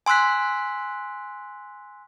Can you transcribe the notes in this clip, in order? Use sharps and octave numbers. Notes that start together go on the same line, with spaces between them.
G#5 C6 E6 F#6 B6